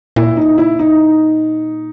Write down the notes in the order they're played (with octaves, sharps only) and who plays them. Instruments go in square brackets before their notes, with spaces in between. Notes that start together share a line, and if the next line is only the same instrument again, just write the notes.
[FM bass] A#2 [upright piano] E4
[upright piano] D#4
E4
D#4